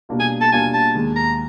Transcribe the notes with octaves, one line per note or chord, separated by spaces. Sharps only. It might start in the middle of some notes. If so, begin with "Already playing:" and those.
B2 G3 A#3 D4 F4
G#5
A5
B2 G3 A#3 D4 F4 G#5
A5
D#2 D#3 G#3
A#5